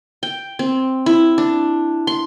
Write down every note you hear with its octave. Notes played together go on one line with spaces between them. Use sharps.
G5
C4
E4
D4
C6